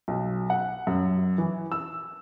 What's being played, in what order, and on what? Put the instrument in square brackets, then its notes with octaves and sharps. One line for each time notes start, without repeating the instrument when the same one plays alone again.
[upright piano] B1
F#5
F#2
E3
E6